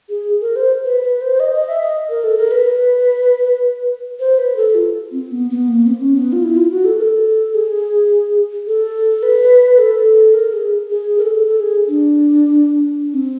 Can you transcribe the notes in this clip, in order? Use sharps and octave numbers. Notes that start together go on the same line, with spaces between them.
G#4
A#4
C5
B4
B4
C5
D#5
D#5
E5
D#5
A#4
A4
A#4
B4
C5
B4
A4
F4
C4
B3
B3
A#3
C4
C#4
B3
F4
E4
F4
F#4
A4
A#4
A4
G#4
A4
B4
A4
A#4
G#4
G#4
A#4
A4
A4
G#4
D4
C4